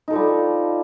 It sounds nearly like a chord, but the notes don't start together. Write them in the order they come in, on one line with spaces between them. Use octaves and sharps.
D#4 A4 F3 G3